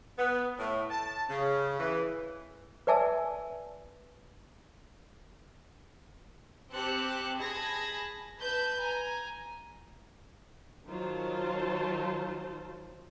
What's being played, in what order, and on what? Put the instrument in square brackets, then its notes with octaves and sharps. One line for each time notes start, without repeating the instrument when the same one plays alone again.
[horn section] B3
A2
A5
C#3
E3
[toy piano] B4 D5 E5 G#5 A5 E6
[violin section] C4 G4 A5 F#6 C#7
G#4 A5 B5 G#6 A#6
B4 A5 B5 G6
G#5 A#5
[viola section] D#3 F#3 F4 C5 A5